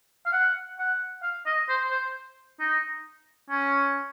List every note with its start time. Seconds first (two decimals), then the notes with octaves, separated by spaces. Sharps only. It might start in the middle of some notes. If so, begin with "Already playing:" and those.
0.26 F5
0.33 F#5
0.79 F#5
1.23 F5
1.46 D#5
1.69 C5
1.91 C5
2.60 D#4
3.50 C#4